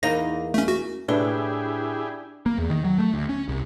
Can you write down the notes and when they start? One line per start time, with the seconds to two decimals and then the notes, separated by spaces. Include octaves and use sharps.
0.03 E2 A#3 D#4 A#6
0.54 A3 C#4
0.68 F#4
1.08 A2 D4 E4 G4 G#4 B4 G7
2.46 A#3
2.58 E2
2.70 D#3
2.85 F#3
2.98 A3
3.14 D2
3.29 C#4
3.49 C2